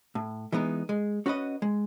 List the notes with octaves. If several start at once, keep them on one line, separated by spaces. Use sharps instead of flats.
A2
E3 G#3 B3 D#4
G#3
C#4 F#4 B4 D#5
G#3